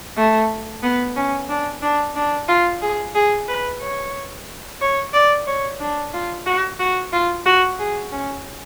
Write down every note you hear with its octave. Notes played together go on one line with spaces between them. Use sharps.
A3
B3
C#4
D4
D4
D4
F4
G#4
G#4
B4
C#5
C#5
D5
C#5
D4
F4
F#4
F#4
F4
F#4
G#4
C#4